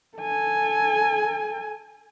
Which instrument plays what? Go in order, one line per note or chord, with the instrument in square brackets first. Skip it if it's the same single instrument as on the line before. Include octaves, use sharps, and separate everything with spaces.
[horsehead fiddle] A4 G#5